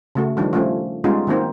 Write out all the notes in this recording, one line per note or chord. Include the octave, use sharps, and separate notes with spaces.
C#3 A3 F#4
D#3 F3 G3 D4
F3 G3 A3 C#4
G3 G#3 B3 C#4 D#4 F4
D#3 F#3 A#3 C4 D#4